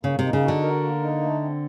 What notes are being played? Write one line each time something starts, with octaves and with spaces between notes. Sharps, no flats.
C#3 A#3
C3
D#4
C#3
D3 F#4
A#4
A#3
D#4
A3
C4